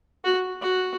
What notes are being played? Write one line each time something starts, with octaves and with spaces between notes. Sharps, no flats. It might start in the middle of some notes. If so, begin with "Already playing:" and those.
F#4
F#4